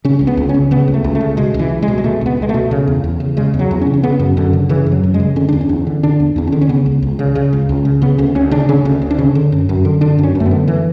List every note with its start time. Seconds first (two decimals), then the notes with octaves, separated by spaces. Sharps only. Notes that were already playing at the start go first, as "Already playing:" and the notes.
0.05 C#3 C#4
0.19 C#2 C#4
0.27 B3
0.37 C#2
0.49 C#4
0.54 C#3
0.71 C#3 B3
0.88 C#2
0.94 A3
1.04 C#2
1.15 A3
1.21 C#3
1.37 B2 G#3
1.54 C#2 E3
1.71 C#2
1.82 G#3
1.88 B2
1.98 G#3
2.04 B2 A3
2.21 C#2 B3
2.37 C#2 G#3
2.49 A3
2.54 B2
2.71 C#3
2.87 E2
3.04 E2
3.20 C#3
3.37 C#3 G#3
3.54 E2
3.59 F#3
3.71 E2
3.81 C#4
3.87 C#3
3.94 C#4
4.03 C#3 B3
4.19 F#2
4.37 F#2 D3
4.53 C#3
4.69 C#3 E3
4.86 F#2
4.92 F#3
5.03 F#2
5.14 G#3
5.20 C#3
5.36 D3 C#4
5.49 E2 D4
5.61 C#4
5.69 E2
5.87 D3
6.03 D3 D4
6.20 E2
6.36 E2 D4
6.47 D3 C#4
6.61 C#4
6.69 C#3 B3
6.86 C#2
7.02 C#2
7.19 C#3
7.35 C#3
7.53 C#2
7.69 C#2
7.85 C#3
8.02 C#3 B3
8.18 D2 C#4
8.35 D2 C#4
8.51 C#3 D4
8.69 C#3 C#4
8.85 D2 C#4
9.02 D2
9.11 D4
9.19 C#3 C#4
9.35 D3
9.52 F#2
9.69 F#2
9.85 D3
10.01 D3 D4
10.18 F#2 C#4
10.35 F#2
10.40 A3
10.46 B3
10.51 D3
10.68 D3 E3